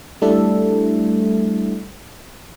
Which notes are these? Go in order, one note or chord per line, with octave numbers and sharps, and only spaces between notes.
G3 A3 D4 E4 A4 E5